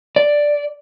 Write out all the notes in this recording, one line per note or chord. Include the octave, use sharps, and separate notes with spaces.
D5